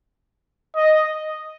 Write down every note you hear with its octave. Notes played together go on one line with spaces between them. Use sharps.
D#5